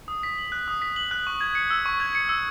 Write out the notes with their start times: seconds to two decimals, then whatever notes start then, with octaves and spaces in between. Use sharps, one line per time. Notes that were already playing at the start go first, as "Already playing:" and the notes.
0.08 D#6
0.23 B6
0.38 F#7
0.52 F#6
0.68 D#6
0.82 B6
0.96 F#7
1.11 F#6
1.27 C#6
1.41 G#6
1.55 C#7
1.71 E6
1.86 C#6
2.00 G#6
2.15 C#7
2.29 E6